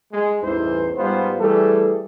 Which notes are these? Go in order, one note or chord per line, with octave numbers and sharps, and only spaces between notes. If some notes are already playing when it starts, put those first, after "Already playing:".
G#3
A1 E2 G2 E3 D#4 C5
G#2 G3 B3 F4 C5
E3 G3 A3 G#4 A4